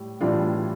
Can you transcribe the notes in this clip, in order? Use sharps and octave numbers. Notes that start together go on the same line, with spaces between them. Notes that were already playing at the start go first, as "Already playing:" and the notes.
Already playing: A2 G3
A2 E3 G3 D4 F4